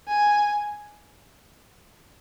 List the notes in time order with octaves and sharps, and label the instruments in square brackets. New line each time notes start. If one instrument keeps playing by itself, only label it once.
[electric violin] G#5